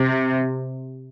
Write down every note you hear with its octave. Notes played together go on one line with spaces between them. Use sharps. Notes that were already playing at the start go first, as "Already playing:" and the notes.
Already playing: C3